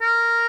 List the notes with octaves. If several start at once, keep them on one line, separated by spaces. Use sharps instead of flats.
A#4